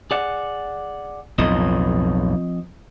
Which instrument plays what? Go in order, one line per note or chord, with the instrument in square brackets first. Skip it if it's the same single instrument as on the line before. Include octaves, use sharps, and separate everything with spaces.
[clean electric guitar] G#4 D5 F#5
[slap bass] B1 F2 A2 [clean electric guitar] F3 C4 D#5